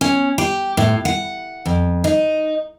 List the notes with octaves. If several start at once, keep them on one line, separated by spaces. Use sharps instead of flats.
C#4
G4
A2
F#5
F2
D#4